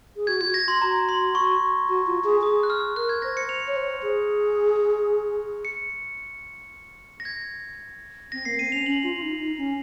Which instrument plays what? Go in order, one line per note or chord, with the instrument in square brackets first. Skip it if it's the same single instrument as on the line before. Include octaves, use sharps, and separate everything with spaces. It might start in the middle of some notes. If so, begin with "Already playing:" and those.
[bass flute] G#4
[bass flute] F#4 [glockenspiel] G#6
[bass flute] F4 [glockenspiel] G#6
[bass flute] F#4
[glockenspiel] A#6
C6
[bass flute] F#4 [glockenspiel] A#5
[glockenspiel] C6
C#6
[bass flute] F#4
F4
G#4
[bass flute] G#4 [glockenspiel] D#6
[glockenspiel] F#6
F6
[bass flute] A#4 [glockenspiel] F#6
[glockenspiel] G#6
[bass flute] C5 [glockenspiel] A#6
[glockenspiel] C#7
F7
[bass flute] C#5
C5
G#4
[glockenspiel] C#7
A#6
G#6
[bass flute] C4 [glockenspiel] A#6
[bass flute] A#3 [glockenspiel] C7
[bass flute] C4 [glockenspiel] D#7
[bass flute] C#4 [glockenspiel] F7
[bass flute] C#4 [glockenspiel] F#7
[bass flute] F4
F4
D#4
D#4
C#4